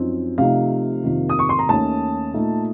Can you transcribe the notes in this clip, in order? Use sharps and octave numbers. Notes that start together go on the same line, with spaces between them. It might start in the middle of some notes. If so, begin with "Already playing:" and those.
Already playing: F#2 F3 C4 D#4
C3 F3 A3 D#4 F5
F2 C3 D#3 A#3
D#6
C#6
C6
A#5
D#2 D#3 A3 C#4 A5
A#2 A3 D#4